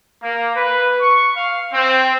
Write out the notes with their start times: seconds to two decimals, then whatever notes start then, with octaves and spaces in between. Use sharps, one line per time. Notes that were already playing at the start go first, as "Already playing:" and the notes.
0.23 A#3
0.56 B4
1.00 C#6
1.36 F5
1.73 C4